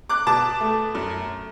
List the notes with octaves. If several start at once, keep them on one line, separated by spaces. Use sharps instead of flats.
D6 F#6
B2 A5 D6
A3
F#2